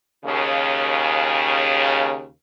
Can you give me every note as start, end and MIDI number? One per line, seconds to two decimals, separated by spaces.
0.24 2.27 39
0.24 2.27 49